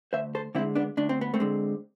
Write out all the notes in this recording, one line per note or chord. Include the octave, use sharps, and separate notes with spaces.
D2 C5 E5
A4 C5
D3 G#3 C4 E4
B3 D4
D2 D4
C4
B3
A3 C4
D3 G#3